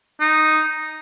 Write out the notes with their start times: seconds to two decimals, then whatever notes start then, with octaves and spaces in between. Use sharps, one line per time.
0.20 D#4